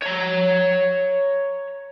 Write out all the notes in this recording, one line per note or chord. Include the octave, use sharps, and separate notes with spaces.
C#5 A#5